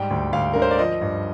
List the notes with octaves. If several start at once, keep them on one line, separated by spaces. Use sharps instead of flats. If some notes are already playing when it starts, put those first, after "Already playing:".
Already playing: G#2 G3 G5
D2
D2 F5
D3 A#4
C5
D5
F3 D#5
G2